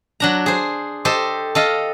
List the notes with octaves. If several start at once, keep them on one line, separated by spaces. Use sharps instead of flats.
F#3 D4 A#5
G#4 C5
G4 A4 C5 D#5
A4 D#5 F5